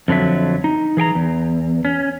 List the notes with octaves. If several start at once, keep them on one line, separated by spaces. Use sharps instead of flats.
F2 D3 F#3 E5
D#4
E3 G#4 G5 A#5
E2
C#4